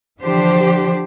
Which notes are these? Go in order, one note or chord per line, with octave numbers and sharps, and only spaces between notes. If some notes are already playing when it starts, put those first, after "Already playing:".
D3 E3 F3 D4 G4 C5